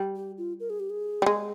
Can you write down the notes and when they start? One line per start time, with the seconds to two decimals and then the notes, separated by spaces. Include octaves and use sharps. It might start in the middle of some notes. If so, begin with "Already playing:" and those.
Already playing: G3
0.16 G4
0.38 F4
0.60 A#4
0.70 G#4
0.80 G4
0.90 G#4
1.22 G3
1.26 G#3